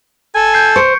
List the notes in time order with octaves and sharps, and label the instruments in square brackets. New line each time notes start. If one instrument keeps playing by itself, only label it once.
[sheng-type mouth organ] A4 [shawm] G#5
[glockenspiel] G6 C7
[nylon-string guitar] C5 [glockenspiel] C#6 C#7 D7